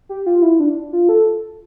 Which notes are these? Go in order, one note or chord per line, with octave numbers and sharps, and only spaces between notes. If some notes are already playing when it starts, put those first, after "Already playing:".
G4
F4
E4
D4
F4
A4